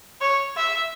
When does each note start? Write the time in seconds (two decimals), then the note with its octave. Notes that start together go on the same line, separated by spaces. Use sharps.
0.21 C#5
0.57 E5